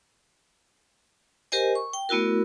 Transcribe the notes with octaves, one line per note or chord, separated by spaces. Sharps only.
G4 A#4 C5 D#5 G#5
C#6
G5
A3 B3 E4 F#4 A#4